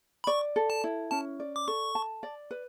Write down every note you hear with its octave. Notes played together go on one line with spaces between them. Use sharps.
B5
D5 C#6
A4
A5
E4
C#4 A5
D5
D6
A4 C#6
A5
D5
B4